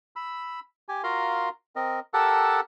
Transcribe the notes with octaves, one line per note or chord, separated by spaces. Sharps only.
B5 E6
G4 G#5
F4 F#4 A#4 F5 A#5 C6
C4 A#4 D#5
G4 A4 A#4 F#5 A5 E6